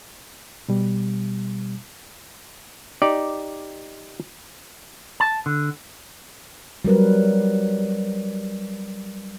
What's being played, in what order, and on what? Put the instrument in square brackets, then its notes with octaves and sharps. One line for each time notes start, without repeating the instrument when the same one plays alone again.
[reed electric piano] B2 G3
[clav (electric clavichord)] D#4 G4 D5
[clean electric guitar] A5
D3
[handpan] F#3 G3 A#4 B4